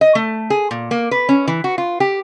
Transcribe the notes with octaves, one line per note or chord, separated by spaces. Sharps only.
D#5
A3
G#4
A#2
A#3
B4
C#4
E3
F#4
F4
G4